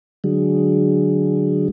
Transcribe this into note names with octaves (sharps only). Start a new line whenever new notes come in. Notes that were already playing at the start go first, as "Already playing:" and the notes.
D3 F#3 G#3